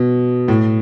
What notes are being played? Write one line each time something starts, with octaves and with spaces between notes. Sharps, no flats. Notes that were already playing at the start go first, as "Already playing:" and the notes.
Already playing: B2
A2